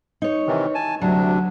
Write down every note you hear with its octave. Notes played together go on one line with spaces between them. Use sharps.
D#4 C#5
C3 D#3 E3
G#5 A5
D2 C3 F#3 D4